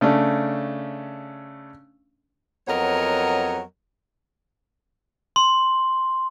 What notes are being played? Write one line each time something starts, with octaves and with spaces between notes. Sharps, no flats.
C#3 A3 C#4 D4
F2 F#3 B3 A#4 C#5 D#5
C6